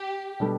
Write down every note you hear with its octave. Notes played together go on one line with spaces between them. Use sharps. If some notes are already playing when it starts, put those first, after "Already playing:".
Already playing: G4
B2 G3 D4 A4